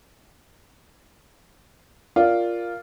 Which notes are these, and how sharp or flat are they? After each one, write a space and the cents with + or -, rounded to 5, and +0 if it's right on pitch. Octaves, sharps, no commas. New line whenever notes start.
F4 -5 A#4 +0 D5 -10